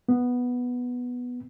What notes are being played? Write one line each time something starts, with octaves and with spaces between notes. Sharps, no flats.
B3